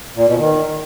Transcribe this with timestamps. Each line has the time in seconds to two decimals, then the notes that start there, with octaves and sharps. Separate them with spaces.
0.16 A#2
0.27 B2
0.38 D#3